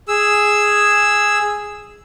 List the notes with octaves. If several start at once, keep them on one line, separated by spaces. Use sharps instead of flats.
G#4 E6